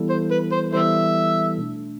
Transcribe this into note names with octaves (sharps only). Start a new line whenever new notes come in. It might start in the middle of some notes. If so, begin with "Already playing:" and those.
Already playing: E3 G3 B3 E4 A4
C5
B4
C5
E3 G3 B3 E4 A4 C5 E5
B2 A3 D4